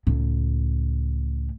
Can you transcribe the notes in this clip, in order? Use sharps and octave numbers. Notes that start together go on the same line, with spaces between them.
C#2 A2